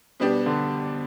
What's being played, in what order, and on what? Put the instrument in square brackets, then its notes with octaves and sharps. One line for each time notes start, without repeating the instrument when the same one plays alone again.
[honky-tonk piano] B2 B3 D4 G4 [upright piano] G3
[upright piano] D3